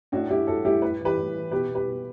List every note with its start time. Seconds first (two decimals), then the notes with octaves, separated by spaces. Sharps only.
0.12 A2 D4 F#4
0.30 A2 E4 G4
0.47 A2 F#4 A4
0.65 A2 E4 G4
0.82 A2 B4
1.00 E3
1.05 G4 B4
1.16 A2
1.35 E3
1.51 B2 G4 B4
1.68 B2
1.74 G4 B4
1.86 B2